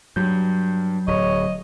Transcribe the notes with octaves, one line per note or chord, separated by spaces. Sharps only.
G2 F#3 G6
D1 C#5 D#5